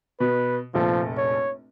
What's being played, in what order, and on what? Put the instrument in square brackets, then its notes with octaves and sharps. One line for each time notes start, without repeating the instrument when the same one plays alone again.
[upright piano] B2 [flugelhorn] B4
[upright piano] F1 A#1 A4 [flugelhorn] F3
[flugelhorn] C#5